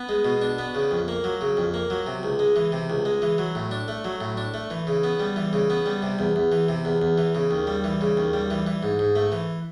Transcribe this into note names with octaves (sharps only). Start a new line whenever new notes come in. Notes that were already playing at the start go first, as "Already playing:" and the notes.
Already playing: B3
G#3
B2
D4
B3
C#3
F2
A#3
F#3
C#3
F2
A#3
F#3
C3
C#2
G#3
E3
C3
C#2
G#3
E3
F#3
A2
D4
A3
F#3
A2
D4
A3
E3
C#3
B3
G3
E3
C#3
B3
G3
C3
E2
E2
E3
C3
E2
E2
E3
C#3
D#2
G3
E3
C#3
D#2
G3
E3
E3
G#2
G#2
A3
E3